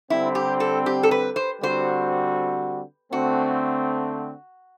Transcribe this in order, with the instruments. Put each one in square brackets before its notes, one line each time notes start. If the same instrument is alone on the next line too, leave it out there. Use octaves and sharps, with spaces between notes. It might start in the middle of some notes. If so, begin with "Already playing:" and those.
[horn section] D3 G3 C4 [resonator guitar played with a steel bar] E4
[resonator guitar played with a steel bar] G4
A4
G4
A4
B4
C5
[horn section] D3 G3 C4 F#4 [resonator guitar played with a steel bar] C5
[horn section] D3 A3 C4 [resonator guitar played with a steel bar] F#4